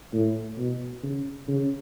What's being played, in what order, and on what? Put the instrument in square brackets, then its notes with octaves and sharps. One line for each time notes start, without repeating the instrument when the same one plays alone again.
[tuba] A2
B2
C#3
C#3